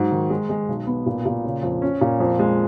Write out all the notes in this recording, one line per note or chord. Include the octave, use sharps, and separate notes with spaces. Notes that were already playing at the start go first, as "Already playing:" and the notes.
Already playing: G#2 F#3
D#3
G#3
G#3
B1
B3
A#2
A#2
C#3
F2
C#4
A#2
F2
G#3